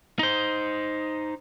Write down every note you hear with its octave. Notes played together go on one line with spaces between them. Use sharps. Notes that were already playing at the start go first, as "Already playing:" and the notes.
D#4 C5